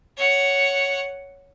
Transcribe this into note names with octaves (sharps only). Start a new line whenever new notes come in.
C#5 F#5